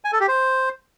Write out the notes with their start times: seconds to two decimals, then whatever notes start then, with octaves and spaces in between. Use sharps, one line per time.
0.05 G#5
0.12 A4
0.20 G4
0.28 C5